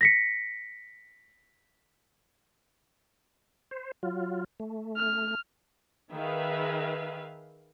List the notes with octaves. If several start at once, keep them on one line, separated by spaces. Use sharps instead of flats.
A#6 B6 C#7
C5
F#3 F4
A3
F6
D#3 G#4 B4 E5 F5